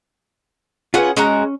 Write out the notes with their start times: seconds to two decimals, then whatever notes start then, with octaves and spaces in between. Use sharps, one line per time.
0.94 C#4 F4 G#4 B4 F#5
1.17 G#3 C#4 F#4 A#5